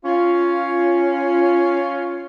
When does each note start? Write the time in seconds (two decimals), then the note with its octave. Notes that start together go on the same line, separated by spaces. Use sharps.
0.05 C#4 F4